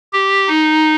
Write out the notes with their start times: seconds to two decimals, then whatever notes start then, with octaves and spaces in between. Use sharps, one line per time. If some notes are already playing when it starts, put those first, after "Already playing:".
0.13 G4
0.48 D#4